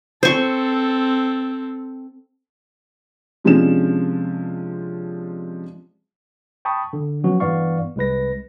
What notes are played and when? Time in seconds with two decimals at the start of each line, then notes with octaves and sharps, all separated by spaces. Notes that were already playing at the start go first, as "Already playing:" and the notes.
0.23 C4 A4 C5 C#6
3.44 C3 F3 G#3 C#4 D4 E7
6.65 G5 A5 B5 C#6 D#6
6.93 D3
7.24 F3 F#3 B3 C#4 F#4
7.40 G2 E3 B3 D5 F5 C#6
7.96 C2 G#3 B4 A#6